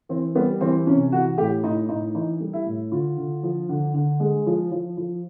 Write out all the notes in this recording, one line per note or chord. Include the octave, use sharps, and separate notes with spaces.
E3 C4
G3 B3
E3 C4
C3 C#4
E3 F#4
A2 G4
A2 D#4
A2 D#4
E3 D#4
G3
E4
A2
D3 F4
D3
F3
D3
D3
G#3
F3
F3
F3